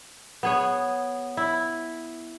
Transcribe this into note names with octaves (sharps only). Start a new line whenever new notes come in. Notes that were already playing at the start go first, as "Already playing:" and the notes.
B3 G#4 C#5
E4